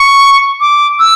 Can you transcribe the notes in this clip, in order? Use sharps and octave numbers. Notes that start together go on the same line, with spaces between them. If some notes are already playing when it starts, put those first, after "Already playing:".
Already playing: C#6
D6
E6